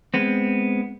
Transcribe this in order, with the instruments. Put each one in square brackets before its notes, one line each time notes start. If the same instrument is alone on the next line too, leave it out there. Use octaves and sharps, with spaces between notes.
[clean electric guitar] G#3 B3 C4